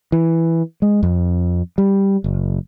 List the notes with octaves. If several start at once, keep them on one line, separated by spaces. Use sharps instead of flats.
E3
G#3
F2
G3
F#1